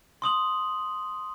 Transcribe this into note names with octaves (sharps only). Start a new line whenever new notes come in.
C6 D#6 F#7